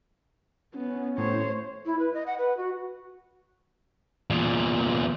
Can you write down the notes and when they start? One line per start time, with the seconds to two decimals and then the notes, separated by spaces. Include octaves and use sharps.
0.75 B3 C#4
1.18 A2 C5 C#5
1.86 E4
1.99 B4
2.14 D#5
2.27 F#5
2.38 B4
2.57 F#4
4.30 E2 A#2